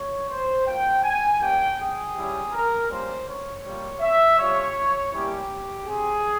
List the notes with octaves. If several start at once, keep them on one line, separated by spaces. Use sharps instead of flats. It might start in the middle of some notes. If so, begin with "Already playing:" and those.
Already playing: C#5
C5
A#3 F4 G5
G#5
A#3 C#4 G4 G5
G#4
G3 C#4 E4 G4
A#4
G3 A#3 C#4 F4 C5
C#5
G3 A#3 F4
E5
G3 C#4 F4 C#5
G3 A#3 C#4 E4 G4
C4 G4 G#4